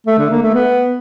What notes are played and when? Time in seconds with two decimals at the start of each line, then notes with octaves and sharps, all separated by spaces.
0.07 A3
0.19 D3
0.30 A#3
0.42 A3
0.54 B3